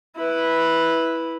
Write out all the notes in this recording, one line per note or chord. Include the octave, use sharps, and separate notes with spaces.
E4 B4